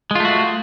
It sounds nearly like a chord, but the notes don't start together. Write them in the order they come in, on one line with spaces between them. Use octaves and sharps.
G#3 F4 A3 F#4